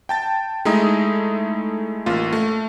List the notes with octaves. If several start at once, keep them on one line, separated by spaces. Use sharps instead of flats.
G5 A5 A6
G#3 A3 D#4 E4 A#5 D#6
A1 A#3 F4
A3